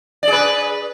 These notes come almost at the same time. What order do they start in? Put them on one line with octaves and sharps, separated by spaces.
D5 G#4 B4